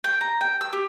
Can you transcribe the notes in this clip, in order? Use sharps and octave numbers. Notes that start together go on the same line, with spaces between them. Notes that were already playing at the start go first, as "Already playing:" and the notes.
G5
A#5
G5
E6
G4